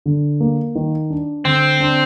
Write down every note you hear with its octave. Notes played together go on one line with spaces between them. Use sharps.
D3
A#3
D#3
D4
D3 C4
D4